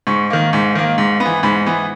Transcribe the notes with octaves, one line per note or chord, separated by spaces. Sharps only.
G#2 C#6
D#3 A#3
G#2
D#3 A#3
G#2
B3
E3
G#2 B5
E3 B3